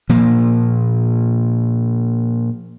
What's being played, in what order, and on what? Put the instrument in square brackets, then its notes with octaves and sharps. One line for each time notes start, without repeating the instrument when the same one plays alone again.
[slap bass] A#2 F3 A#3